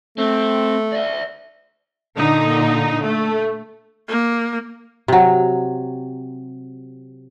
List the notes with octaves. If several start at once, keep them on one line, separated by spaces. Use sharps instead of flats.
A3 C4
D5 E5
A#2 D3 D#4
A3
A#3
C3 F#3